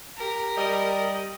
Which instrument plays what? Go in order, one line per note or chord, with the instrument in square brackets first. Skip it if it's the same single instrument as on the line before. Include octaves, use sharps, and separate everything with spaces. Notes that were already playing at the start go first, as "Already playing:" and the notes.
[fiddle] G4 A#4
[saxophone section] G3 D#5